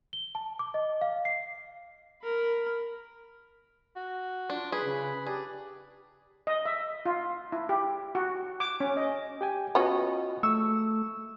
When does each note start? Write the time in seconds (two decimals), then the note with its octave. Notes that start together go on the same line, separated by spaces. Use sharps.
0.13 G7
0.35 A5
0.59 D6
0.74 D#5
1.01 F5
1.25 C7
2.22 A#4 B5
3.96 F#4
4.50 D4 F4
4.72 G#4 B4
4.84 C#3
5.26 D4 G4 G#4
6.47 D#5
6.65 E5
7.05 F4
7.52 E4
7.69 G4
8.15 F#4
8.60 D6
8.80 C#4
8.97 D#5
9.41 G4 G5 G#5
9.75 B3 C#4 F4 F#4 D#5
10.43 A3 C#6 E6